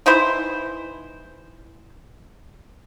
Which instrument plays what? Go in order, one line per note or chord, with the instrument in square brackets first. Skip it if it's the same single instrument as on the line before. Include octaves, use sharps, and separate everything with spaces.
[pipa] E3 D#4 E4 C5